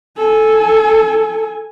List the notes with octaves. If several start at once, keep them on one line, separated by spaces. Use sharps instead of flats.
A4 G#5